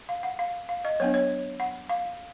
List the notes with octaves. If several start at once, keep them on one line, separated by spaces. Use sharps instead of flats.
F5
F#5
F5
F5
D#5
F#3 B3 D4 C#5
C#5
F#5
F5